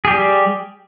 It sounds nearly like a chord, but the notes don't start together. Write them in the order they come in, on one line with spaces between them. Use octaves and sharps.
G#4 G4 G3